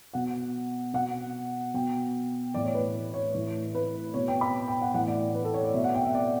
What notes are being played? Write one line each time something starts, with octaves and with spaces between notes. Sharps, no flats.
B2 F#5
B2 F#5
B2 G5
A2 E3 D5
C#5
B4
C#5
A2 E3
B4
B2 C#5
G5
B5
G5
F#5
A2 E3 F#5
D5
B4
A4
C#5
D5
B2 E5
F#5
G5
E5
D5